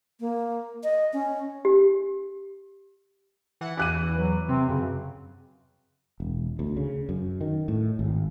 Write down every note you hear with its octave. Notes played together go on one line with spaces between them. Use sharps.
A#3
D#5
C#4
G4
E3 F#5
E2 E3 D6 F#6 D#7
F#3 B4
C3 C4
F#2 C#3
E1
D2
C#3
F#2
D#3
A2
G#1